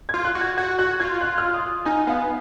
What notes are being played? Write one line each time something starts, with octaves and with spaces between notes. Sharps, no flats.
F4 G#6
F#6
F#4
G#6
F#4 G#6
F#4 F#6
F4 G#6
F#6
F6
D#6
D#4 G#5
B3 F5